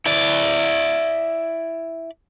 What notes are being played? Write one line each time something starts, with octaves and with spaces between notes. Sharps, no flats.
E4 D5